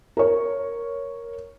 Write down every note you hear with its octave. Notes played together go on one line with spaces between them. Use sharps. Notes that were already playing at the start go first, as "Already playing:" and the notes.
A#4 C#5